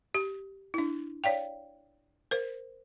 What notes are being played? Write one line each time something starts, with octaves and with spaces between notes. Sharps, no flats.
G4
D4 E4
C#5 D5 F5 G5
A#4 C5